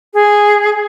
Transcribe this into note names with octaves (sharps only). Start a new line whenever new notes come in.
G#4